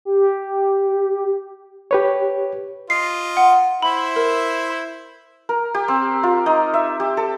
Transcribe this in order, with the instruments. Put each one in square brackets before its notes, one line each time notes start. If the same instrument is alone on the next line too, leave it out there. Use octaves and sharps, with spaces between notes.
[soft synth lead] G4
[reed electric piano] G4 B4 C#5
[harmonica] F4 D#5 [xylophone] C7
[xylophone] F#5
[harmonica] E4 C5 E5 [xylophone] B5
[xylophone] A#4
[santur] A#4
G4
C4
F4
D#4
E5
G4
A4